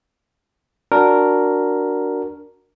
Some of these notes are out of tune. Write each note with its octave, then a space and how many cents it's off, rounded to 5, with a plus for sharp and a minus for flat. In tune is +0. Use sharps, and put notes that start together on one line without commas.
D4 +0 F#4 +0 A#4 +0